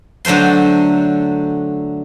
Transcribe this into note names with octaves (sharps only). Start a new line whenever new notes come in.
D3 F#3 A3 C5 C6